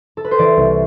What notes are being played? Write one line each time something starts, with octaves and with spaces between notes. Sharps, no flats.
A4
B4
C5
E3 D5
C2